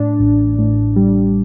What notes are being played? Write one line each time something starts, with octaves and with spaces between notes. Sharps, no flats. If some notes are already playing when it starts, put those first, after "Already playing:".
Already playing: A2 D4
A1
A2
G3